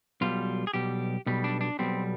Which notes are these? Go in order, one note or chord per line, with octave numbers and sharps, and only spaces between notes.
B1 B2 G3 F4
G#4
B1 B2 G3 G4
B1 B2 G3
D4
D4
B1 B2 G3 C4